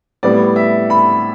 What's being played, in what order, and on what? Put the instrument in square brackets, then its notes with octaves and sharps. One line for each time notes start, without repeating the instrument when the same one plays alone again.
[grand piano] A2 G3 B3 D5
E5
B5